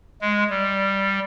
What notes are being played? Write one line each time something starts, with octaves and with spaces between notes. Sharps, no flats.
G#3
G3